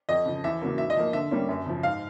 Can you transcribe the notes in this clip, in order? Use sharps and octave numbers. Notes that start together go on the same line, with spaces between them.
F2 D#5
C#3 F3
E2 E5
C#3 F#3 A#3
G#2 E5
D#5
F3 A#3
D3 E5
G3 A#3 C#4
F#2
C#3 F3
G#2 F5